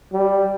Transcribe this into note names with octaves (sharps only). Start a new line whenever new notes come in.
G3